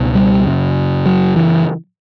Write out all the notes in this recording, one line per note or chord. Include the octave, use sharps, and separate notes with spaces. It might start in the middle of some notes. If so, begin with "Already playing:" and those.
Already playing: C#2 B2
G3
F#2 C#3
F#3
E3